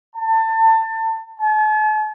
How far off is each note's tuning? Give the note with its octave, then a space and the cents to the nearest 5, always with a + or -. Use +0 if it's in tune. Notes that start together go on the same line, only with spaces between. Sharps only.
A5 +25
A5 -45